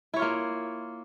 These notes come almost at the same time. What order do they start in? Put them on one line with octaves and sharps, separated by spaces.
E4 C#5 F4 A#3